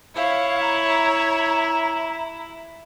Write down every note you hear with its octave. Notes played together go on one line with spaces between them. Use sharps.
E4 C#5 F5
A#5